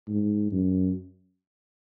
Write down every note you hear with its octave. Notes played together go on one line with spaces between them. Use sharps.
G#2
F#2